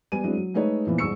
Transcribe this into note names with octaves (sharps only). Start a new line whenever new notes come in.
G3 B3 G#5 D#7
F#3 G#3 C4 D4 E4
F#3
G#3 A3 D#4 B4 C#5
A#2 E3 F3 B3
C2 G#2 G#3 C#6 E6 C#7